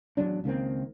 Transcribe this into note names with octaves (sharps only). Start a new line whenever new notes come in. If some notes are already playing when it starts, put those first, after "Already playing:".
A1 E2 F#3 D4
C#2 D#3 A#3 C4